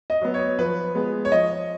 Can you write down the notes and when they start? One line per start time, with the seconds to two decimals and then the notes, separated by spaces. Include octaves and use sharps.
0.10 D#5
0.22 F#3 B3
0.34 C#5
0.59 F3 B4
0.95 G#3 B3
1.25 C#5
1.32 F3 D#5